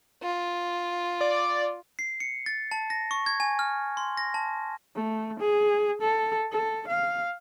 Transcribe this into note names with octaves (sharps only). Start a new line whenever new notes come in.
F4
D5
C7
C#7
A6
A5
A#6
C#6
G#6
G#5
F6
C6
A#6
A5
A3
G#4
A4
A4
F5